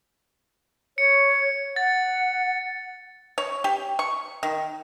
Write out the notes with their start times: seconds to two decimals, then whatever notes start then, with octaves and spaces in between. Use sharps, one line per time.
0.98 C#5 C#7
1.76 F#5 A6
3.38 C#5
3.64 G4
3.99 C#6
4.43 D#3